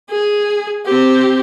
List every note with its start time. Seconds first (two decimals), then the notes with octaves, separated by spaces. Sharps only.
0.10 G#4
0.85 C4 G4